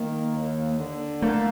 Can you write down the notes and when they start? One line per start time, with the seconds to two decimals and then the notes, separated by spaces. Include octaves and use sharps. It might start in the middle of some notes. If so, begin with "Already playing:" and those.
Already playing: D#3 A#3
0.33 D#2
0.78 D3
1.22 A3 A#3